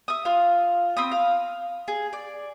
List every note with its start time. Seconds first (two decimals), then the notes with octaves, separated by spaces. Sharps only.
0.08 E5 D#6
0.25 F4 F5
0.97 C4 B5 D#6
1.12 F5
1.88 G#4
2.13 D5